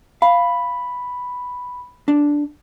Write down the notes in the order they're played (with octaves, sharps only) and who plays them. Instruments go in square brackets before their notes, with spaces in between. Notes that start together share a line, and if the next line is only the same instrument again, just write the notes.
[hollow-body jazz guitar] F5 [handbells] B5
[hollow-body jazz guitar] D4